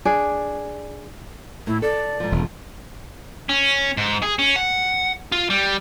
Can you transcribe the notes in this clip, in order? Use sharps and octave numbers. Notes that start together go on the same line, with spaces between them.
D4 G#4 D5
A2 E4
A4 D5
G#2 F3
E1
C#4
G#2
G#4
C#4
F#5
F4
G3